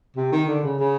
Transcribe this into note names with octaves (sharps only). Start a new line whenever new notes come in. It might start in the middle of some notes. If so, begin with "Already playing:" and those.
C3
D#3
D3
C#3
C#3